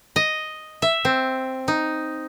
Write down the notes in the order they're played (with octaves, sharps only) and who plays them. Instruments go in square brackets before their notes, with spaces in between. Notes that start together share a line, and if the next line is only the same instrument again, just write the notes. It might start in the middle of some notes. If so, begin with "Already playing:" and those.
[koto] D#5
E5
C4
D#4